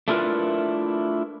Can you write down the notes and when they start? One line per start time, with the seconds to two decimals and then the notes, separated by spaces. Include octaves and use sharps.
0.08 A3 D4 E4 F4 A#4 B4